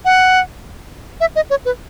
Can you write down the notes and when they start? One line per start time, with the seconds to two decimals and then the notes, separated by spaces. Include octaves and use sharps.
0.05 F#5
1.21 E5
1.36 D#5
1.50 C#5
1.65 B4